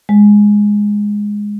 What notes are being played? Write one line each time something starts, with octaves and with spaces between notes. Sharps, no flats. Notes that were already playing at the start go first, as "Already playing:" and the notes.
G#3